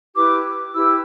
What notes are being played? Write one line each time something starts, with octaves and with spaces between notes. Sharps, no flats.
E4 G4 B4 D6
E4 G4 B4 E6